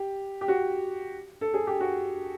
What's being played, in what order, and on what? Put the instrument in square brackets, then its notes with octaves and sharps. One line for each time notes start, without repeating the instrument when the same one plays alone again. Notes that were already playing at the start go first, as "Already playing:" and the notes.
Already playing: [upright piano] G4
G4
F#4
A4
G#4
G4
F#4